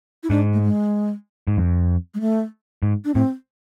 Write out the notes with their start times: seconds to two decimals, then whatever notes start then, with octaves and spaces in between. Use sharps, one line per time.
0.23 E4
0.30 G#2 D4
0.53 A3
0.63 G#3
1.47 G#2
1.57 F2
2.14 G#3
2.21 A3
2.83 G#2
3.05 D4
3.14 A2 C4